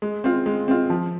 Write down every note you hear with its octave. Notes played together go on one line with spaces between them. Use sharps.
G#3
C4 F4
G#3
C4 F4
F3